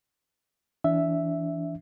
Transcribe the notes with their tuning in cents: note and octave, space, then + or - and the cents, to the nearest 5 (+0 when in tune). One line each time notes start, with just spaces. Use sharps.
E3 +0 D4 -30 E5 +0